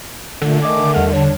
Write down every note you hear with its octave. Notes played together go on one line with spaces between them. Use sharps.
A#2 D3 A3
D#3 A3 D#5 G#5 D6
E2 G3 F#5 F6
D4 C#5